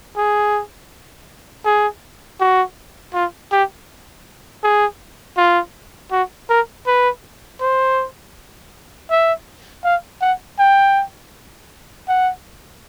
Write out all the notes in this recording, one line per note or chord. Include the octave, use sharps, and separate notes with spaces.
G#4
G#4
F#4
F4
G4
G#4
F4
F#4
A#4
B4
C5
E5
F5
F#5
G5
F#5